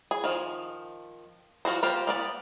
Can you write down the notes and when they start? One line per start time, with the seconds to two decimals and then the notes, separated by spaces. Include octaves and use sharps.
0.11 G#4
0.24 D#3 F3
1.65 F3 F#4 C5
1.83 A#3 F4 G4 C5
2.07 A#3 B3 D5